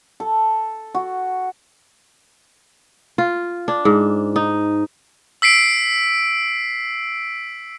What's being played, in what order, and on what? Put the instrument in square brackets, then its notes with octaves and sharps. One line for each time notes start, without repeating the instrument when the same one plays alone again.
[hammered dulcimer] A4
F#4
[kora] F4
D4
G#2
D#4
[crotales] E6 B6 C7 D7